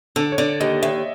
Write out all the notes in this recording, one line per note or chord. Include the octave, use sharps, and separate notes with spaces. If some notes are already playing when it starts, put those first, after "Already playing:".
D3 A4
C#5
D3 D5
D#2 D#5
D#2 E5